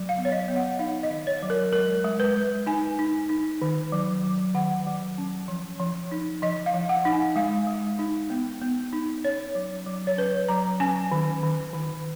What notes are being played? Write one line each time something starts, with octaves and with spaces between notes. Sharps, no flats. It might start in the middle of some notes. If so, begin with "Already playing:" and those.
Already playing: F#3
F5
B3
C#5
D#5
B3
F#5
D#4 F5
D#5
D#3
C#5
F#3
A#4
G#3 A#4
G#3
B4
G#3
D#4 G#5
D#4
D#4
D#3
F#3
F#3
D#3 F#5
F#3
C#4
F3
F3
D#4
F3 D#5
F5
F3
F#5
D#4
G#5
G#3 F5
G#3
D#4
B3
B3
D#4
C#4 C#5
F#3
F#3
C#5
C#4 B4
F#3 A#5
C#4 G#5
D#3
D#3
D#3